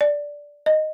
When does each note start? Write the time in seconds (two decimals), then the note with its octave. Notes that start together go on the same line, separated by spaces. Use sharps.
0.01 D5
0.66 D#5